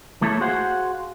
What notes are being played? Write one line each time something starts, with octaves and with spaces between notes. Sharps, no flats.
E2 A3 A#3 E4 A4 C#5
F#4 G#4 C5 F5 F#5